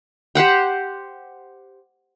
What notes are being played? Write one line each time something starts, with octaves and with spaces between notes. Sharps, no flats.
G4 C5 F#5 G5